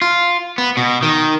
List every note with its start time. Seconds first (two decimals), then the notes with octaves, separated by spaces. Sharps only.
0.02 F4
0.58 B3
0.77 B2
1.03 D#3